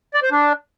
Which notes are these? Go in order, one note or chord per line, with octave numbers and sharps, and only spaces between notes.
D5
C5
D4